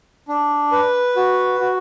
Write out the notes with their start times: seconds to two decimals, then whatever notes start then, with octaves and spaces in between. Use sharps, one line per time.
0.28 D4
0.72 B4
1.16 F#4
1.60 F#4